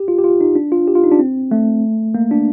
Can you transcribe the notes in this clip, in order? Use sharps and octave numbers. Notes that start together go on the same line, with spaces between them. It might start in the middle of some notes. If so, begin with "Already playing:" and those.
Already playing: G4
F4
G4
F4
D#4
D4
F4
G4
F4
D#4
D4
C4
A3
A#3
D4